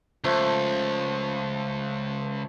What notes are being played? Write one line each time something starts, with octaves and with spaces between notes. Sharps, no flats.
C#2 F3 A3